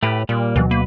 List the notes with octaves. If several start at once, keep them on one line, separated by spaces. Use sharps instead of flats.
A2 A3 G4 B4
A#2 G3 A#3
D2 B2 E3 F#3
A#3 B4